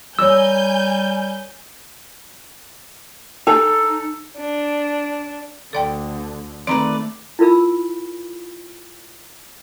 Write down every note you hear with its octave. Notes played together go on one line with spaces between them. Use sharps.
G3 A#4 C#5 G#5 E6 G6
D#4 A4
D4
D2 D3 A4 D5 G5
D#3 A3 C4 B4 D5 A#5
E4 F4 A#4 B5 E6